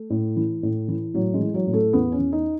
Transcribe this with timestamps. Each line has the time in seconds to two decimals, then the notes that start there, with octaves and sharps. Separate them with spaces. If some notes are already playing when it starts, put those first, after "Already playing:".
Already playing: A3
0.10 A2
0.36 E3
0.63 A2
0.88 E3
1.14 A2 F#3
1.34 G#3
1.40 E3
1.54 F#3
1.67 A2
1.73 A3
1.93 E2 B3
2.12 C#4
2.19 E2
2.32 D#4